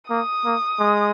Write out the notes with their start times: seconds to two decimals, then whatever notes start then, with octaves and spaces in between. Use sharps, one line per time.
0.10 A#3 D#6
0.45 A#3
0.80 G#3